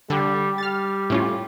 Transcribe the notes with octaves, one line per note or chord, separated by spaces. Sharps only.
D3 G3
G3 F6 A6
A2 C#4 F4